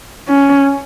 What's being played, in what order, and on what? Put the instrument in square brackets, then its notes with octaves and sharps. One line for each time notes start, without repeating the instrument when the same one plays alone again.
[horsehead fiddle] C#4